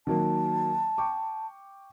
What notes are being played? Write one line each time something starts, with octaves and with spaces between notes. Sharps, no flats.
D#3 F#3 A#3 A5
G5 C#6 D6